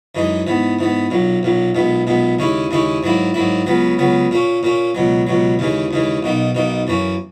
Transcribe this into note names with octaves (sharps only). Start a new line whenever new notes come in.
F#2 E3 G#3 D#4
G#2 E3 B3
G#2 E3 B3
B1 A#2 F#3
B1 A#2 F#3
B1 A#2 G#3 B3
B1 A#2 G#3 B3
D#2 C#3 G#3 C#4 E4
D#2 C#3 G#3 C#4 E4
G#2 F#3 A#3 E4
G#2 F#3 A#3 E4
C#2 C#3 F#3 B3
C#2 C#3 F#3 B3
A#2 A#3 C#4
A#2 A#3 C#4
C#2 B2 F#3
C#2 B2 F#3
D#2 C#3 E3 G#3
D#2 C#3 E3 G#3
B1 B2 A#3 D#4
B1 B2 A#3 D#4
F#2 E3 A#3 C#4